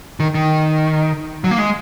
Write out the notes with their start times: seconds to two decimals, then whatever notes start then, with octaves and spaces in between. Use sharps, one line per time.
0.20 D#3
0.34 D#3
1.44 F#3
1.51 A#3
1.58 G#3